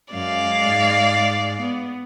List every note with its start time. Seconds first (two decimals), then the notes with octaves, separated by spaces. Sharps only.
0.13 F#2 G#3 D5 F5
0.63 G#2
1.61 B3